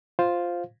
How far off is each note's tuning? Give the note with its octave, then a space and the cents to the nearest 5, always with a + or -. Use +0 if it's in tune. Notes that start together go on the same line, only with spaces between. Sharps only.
F4 +0 C5 +0 F5 +0